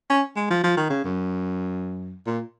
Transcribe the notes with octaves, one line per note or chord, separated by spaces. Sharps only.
C#4
G#3
F3
F3
D#3
C#3
F#2
A#2